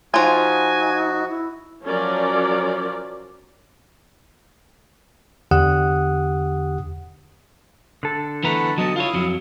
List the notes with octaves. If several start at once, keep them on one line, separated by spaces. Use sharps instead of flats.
F3 D#4 F4 F#4 G#5
E4
F3 F#3 C#4 A#4 D5
E2 D3 G4 F#5 D#6 F#6
D3 A4
E3 A3 B3 B4 A#5 B5
F#3 B3 D#5 A5
E4 F4 C#5 F5 D#6
F2 F#3